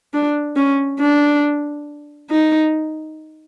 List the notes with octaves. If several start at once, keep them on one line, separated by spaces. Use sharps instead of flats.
D4
C#4
D4
D#4